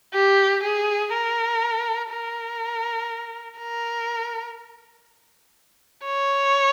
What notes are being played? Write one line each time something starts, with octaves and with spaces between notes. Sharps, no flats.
G4
G#4
A#4
A#4
A#4
C#5